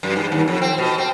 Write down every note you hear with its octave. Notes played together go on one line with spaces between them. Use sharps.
F#2
G2
D#2
F2
C4
B2
C4